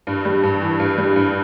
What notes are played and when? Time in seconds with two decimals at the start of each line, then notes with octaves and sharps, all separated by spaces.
0.07 G2
0.25 G3
0.43 G2
0.62 E3
0.80 G2
0.98 G3
1.16 G2